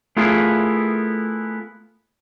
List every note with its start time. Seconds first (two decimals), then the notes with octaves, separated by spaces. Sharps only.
0.17 A3 B3 E4 F4 G#4 A#4